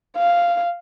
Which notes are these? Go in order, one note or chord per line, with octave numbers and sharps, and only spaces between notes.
F5